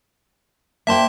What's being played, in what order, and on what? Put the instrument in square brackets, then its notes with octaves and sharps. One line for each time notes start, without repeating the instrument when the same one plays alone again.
[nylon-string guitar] A#3 C5 G5 [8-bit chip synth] E5 A5 C6